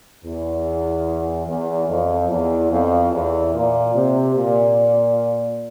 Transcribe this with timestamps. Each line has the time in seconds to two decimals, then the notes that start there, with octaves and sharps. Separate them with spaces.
0.25 E2
1.47 E2
1.89 F2
2.30 E2
2.71 F2
3.12 E2
3.54 A#2
3.95 C3
4.36 A#2